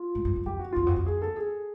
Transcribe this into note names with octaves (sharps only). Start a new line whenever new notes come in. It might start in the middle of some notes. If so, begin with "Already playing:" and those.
Already playing: F4
G#2
G2
F#2
F2 G4
F#4
E2 F4
F2 F#4
F2
G#4
A4
G#4